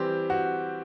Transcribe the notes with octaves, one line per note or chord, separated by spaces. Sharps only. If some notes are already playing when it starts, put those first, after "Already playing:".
Already playing: E3 G3 C4 G4
F#4